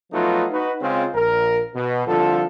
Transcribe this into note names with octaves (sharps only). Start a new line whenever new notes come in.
F3 F#3 A3 B3 D#4 F4
D#4 F#4 B4
C#3 G#3 C4 C#4 F4
A#1 A#4
B2
C2 D3 F3 F4 A4